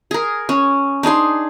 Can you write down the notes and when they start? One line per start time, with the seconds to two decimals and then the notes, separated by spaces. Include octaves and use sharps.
0.11 G#4 A#4
0.49 C#4
1.03 D4 D#4 G#4 C6